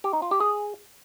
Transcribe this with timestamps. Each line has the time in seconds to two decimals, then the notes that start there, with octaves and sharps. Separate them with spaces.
0.04 G4
0.13 D#4
0.22 F4
0.31 G4
0.40 G#4